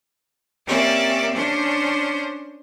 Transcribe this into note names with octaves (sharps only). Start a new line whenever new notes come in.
A#3 C4 C#4 G4 D5 E5
C#4 D4 C5